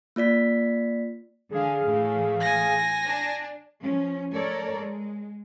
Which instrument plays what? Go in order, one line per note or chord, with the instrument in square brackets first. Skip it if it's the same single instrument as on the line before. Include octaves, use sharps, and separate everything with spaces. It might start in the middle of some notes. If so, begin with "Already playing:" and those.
[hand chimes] A#3 F4 D5 B6
[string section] D3 [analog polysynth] G#4 F5
[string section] A2 E3 A3
[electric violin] G#5 A#6
[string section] D4
[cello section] F3 C#4
A3 A4 A#4 C#5 D5
G#3